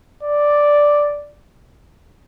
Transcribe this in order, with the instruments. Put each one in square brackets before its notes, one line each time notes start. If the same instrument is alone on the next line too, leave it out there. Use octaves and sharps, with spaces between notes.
[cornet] D5